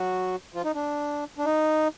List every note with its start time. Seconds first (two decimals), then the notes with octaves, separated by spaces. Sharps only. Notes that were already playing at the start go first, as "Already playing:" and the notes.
Already playing: F#3 F#4
0.54 F3 F4
0.65 D#4
0.75 D4
1.38 D4
1.45 D#4